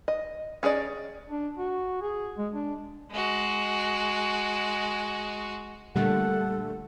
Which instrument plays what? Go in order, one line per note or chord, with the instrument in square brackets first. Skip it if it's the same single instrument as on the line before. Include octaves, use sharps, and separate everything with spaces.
[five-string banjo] D#5
C#4 G#4 A4 D5 D#5
[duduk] D4
F#4
G#4
G#3
D4
[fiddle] G#3 F#4
[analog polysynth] A#2 D3 A3 [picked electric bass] G3 [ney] A4 [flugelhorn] F#5